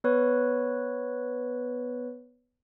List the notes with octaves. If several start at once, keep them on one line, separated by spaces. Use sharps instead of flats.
B3 B4 C#5